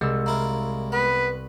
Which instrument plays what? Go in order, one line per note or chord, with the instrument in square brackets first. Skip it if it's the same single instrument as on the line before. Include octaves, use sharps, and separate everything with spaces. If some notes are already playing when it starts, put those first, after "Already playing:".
[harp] C2 E6 [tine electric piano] G#3
[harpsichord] A#3 E4 F4
[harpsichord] B3 [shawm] B4